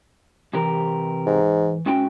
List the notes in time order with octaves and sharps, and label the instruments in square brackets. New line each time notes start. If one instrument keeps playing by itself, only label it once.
[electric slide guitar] C3 G4 A#4 [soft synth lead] E3
[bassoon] G#2
[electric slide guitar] G#2 F#4 G5 [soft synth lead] C#4